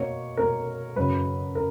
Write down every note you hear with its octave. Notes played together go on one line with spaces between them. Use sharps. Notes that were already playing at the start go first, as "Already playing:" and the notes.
Already playing: B2 A#3 C#5
B2 A#3 A#4
F#2 C#3 F#3 B4
A#4